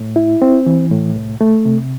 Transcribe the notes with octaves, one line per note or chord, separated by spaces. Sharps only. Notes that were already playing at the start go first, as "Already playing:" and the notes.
Already playing: A2
E4
C4
E3
A2
C2
A3
C3